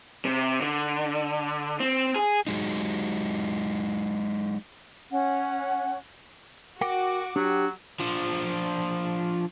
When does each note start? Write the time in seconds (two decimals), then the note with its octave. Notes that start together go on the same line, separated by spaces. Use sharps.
0.25 C3
0.61 D3
1.80 C4
2.16 G#4
2.47 F#3 G#3 D#4
5.11 C#4 F#5
6.81 F#4 A#4 F#5 G5 D6
7.36 F#3 D4 G4
8.00 F3 D4